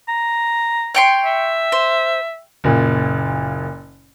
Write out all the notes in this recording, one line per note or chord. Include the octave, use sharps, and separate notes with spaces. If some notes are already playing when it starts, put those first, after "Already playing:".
A#5
C#5 G5 C6
E5
C5
F#1 A#2